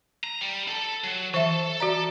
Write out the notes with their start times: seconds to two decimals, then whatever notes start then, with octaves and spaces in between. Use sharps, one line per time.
0.24 A#5
0.41 G3
0.68 A4
1.04 F#3
1.34 E3 A4 E5
1.80 F#4 D5 A#5